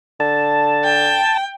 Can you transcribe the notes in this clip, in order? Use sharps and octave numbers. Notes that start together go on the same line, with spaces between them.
D3 A5
G5